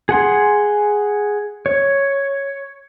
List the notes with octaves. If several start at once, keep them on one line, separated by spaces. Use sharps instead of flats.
G#4 F#5 C6
C#5